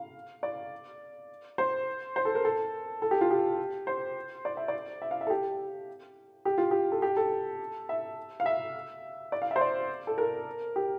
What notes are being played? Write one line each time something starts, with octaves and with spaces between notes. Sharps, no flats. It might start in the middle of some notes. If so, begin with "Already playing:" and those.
Already playing: F5
D5
C5
C5
A4
A#4
A4
A4
G4
F4
G4
C5
D5
E5
D5
E5
F5
E5
A4
G4
G4
F4
G4
A4
G4
A4
E5
F5
E5
D5
F5
C5 E5
D5
A4
A#4
G4